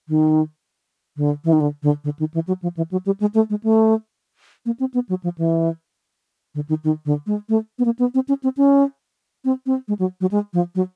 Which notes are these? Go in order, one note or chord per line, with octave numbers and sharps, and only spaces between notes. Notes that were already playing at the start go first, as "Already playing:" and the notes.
D#3
D3
E3
D#3
D3
D3
D3
D#3
E3
F#3
F3
E3
F#3
G3
G#3
A3
G#3
A3
A#3
C4
B3
F#3
F3
E3
D3
D#3
D#3
D3
G#3
A3
B3
A#3
B3
C4
C#4
C4
C#4
C4
C4
G#3
F#3
F#3
G#3
F3
F#3